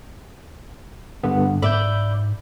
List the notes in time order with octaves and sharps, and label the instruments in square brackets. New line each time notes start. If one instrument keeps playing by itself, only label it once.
[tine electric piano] G2 D3 B3
[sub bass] G#2 [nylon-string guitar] D5 E5 [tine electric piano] B5 D6 G6